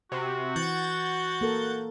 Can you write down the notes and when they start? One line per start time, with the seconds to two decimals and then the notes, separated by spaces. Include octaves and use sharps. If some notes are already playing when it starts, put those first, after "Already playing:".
0.12 C3 F#4
0.56 E3 F#5 G6 A6
1.41 A#3 A4 A#4